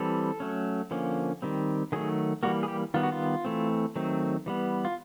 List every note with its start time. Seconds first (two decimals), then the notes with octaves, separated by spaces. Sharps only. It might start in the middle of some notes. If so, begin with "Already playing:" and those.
Already playing: E3 G3 C4 A4
0.40 F#3 A3 C#4
0.91 D3 F3 A#3 C#4
1.42 D#3 G3 C4
1.92 D#3 F#3 A3 G#4
2.43 E3 G3 A#3 F#4
2.63 G#4
2.68 G4
2.94 D#3 G3 B3 F4
3.03 F#4
3.12 F4
3.45 E3 A3 C4
3.96 D#3 F#3 A3 C4
4.46 E3 G3 B3
4.85 F4